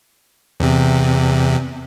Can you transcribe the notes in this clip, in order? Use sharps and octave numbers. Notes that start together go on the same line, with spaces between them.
E2 C3